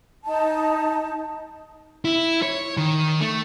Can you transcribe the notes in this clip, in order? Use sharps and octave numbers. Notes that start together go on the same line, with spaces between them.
D#4 A5
E4
C#5
D#3
A3